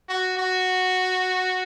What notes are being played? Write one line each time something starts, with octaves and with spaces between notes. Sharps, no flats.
F#4
F#4